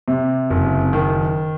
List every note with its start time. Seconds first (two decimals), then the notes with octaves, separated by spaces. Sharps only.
0.08 C3
0.50 F#1
0.93 D#3